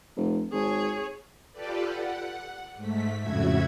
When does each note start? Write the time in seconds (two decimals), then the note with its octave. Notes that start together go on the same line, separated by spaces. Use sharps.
0.16 F1
0.53 G#1 G#4 C#5
1.52 F4 G4 A4 B4 D5
1.85 F#5
2.76 G#2 A3 B6
3.21 F2 A2 C#3 F#4 E5 G#6